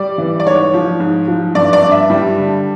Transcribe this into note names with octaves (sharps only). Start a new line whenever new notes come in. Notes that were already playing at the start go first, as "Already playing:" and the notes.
Already playing: G3 D5
E3
D5
G#2 C#5
F3
G#2
F3
G2 D5
D5
G2
E5
G3
D3